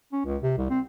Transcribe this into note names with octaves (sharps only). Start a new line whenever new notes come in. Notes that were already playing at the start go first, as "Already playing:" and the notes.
C#4
C#2
C3
C2
C4